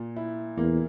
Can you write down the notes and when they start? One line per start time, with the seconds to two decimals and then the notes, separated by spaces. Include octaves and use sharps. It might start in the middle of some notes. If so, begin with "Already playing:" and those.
Already playing: A#2
0.16 E4
0.57 E2 A#3